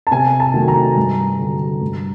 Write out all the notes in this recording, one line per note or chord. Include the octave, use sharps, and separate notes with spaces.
A5
C3 G#5
A5
D#3 F#3 A3
A#5
G2
D3 F#3
G2